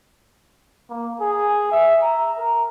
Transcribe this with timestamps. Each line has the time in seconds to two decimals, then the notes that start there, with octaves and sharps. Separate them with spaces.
0.90 A#3
1.20 G#4
1.72 E5
2.02 A#5
2.38 A#4